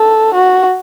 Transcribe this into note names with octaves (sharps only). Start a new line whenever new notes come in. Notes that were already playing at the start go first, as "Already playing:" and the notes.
Already playing: A4
F#4